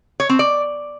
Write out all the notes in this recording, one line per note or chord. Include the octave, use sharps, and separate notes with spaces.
C#5
C4
D5